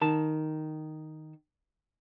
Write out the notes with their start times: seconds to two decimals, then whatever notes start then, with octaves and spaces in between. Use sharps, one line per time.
0.01 D#3 A5